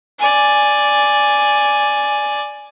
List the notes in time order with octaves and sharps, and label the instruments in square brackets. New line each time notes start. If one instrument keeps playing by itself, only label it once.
[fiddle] D5 G#5